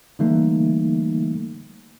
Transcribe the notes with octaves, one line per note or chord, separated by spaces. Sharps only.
D3 E3 G3 A3 A#3 D#4